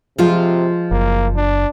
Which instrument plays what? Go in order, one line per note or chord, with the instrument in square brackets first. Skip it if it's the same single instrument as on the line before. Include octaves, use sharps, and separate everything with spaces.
[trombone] C3 [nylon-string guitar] F3 G#3 F4
[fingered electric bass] F#1 [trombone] A#3
[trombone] D4